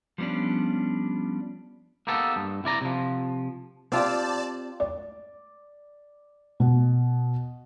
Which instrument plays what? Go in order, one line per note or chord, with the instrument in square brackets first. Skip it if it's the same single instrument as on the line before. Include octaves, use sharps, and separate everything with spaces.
[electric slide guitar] F3 G3 B3 C#4 D4
[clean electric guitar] A#3 B3 D#4 G4 A4
G2
C2 E4 D5 A#5
C3 F3
[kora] C4 F4 G4 [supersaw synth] D5 A5
[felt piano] D5
B2